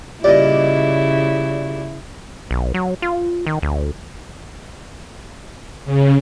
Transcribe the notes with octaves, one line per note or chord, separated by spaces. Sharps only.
A#2 C#3 G3 E4 D5 D#5
B1
F#3
F4
D#3
D2
C#3